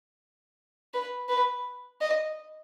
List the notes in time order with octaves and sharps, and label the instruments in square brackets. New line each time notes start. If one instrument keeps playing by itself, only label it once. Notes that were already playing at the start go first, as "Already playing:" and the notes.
[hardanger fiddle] B4
B4
D#5